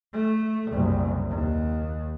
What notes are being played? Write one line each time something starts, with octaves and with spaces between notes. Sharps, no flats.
A3
F#1 C2
D#2